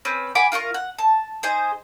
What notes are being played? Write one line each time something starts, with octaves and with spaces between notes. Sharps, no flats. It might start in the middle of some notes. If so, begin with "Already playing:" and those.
C4 C#4 B4
F#5 G#5 B5 D6
F4 A#4 F5 C#6
F#5
A5
D#4 G#4 C5